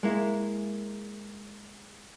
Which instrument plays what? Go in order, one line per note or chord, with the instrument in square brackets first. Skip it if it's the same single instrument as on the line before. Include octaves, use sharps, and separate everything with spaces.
[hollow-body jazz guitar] G#3 A#3 E4